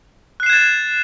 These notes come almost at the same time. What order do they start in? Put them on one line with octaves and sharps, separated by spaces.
F#6 C7 E7 G#6 A6